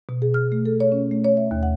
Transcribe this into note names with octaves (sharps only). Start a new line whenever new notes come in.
B2
G#4
F6
A3
A4
C#5
C#4
A3
C#5
E5
D#2
F#5